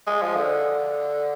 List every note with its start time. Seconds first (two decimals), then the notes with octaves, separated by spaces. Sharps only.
0.07 G#3
0.22 F3
0.36 D3